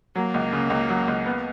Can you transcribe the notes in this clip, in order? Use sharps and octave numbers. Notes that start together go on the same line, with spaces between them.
F#3 A#3
C#2
C#3
C#2
F#3
C#2
B3